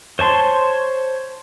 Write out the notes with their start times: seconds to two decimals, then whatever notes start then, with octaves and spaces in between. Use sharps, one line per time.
0.19 C5 C#5 A5 C6